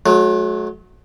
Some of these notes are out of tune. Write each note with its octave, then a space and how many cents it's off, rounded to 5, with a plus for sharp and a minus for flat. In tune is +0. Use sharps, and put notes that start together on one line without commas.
F#3 -15 A3 -45